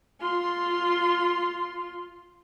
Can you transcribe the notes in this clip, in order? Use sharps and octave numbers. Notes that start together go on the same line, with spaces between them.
F4 C6